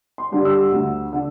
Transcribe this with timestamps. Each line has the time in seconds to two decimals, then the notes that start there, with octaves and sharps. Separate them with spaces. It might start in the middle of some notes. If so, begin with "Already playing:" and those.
0.18 C6
0.32 G2 D3 G3 D4
0.45 E6
0.72 D2
1.13 D3